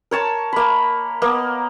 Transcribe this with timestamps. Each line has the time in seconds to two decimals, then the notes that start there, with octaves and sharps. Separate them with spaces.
0.11 A#4 C#5 A5
0.53 A#3 B5
1.22 A#3 B3